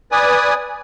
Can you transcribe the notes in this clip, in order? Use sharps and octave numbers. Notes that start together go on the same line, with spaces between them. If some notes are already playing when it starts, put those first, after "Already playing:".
B4 D5 G#5 D#6